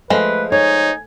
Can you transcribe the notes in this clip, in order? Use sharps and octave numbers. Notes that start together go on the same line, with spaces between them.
F3 G#3 A3 B4
D#4 C#5 G#5